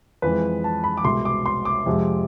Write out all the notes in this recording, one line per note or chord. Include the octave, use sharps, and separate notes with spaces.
F2 E3 G#3 B4
A5
B5
D6
C2 B2 G#3 C6
D6
C6
D6
F2 C3 F3 G#3